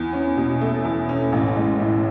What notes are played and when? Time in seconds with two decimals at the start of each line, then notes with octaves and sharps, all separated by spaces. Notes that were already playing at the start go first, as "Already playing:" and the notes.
Already playing: E2
0.13 C#4
0.37 B2
0.61 A3
0.85 E2
1.09 C#4
1.32 A1
1.56 G#3
1.80 A2